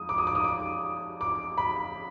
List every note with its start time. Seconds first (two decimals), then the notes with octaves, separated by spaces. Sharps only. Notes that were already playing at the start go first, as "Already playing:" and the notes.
Already playing: F2 G#3 D#6
0.09 D6
0.18 D#6
0.27 D6
0.35 D#6
0.44 D6
1.21 D6
1.58 B5